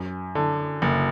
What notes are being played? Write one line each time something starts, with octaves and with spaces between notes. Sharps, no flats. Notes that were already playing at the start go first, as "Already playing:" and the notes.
Already playing: F#2
D3
F#1